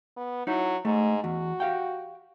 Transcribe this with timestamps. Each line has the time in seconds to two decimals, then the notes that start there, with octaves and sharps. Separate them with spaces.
0.17 B3
0.47 F#3 D#4 E4
0.85 G#2 A3
1.24 E2 F#4
1.60 G4 F5 G5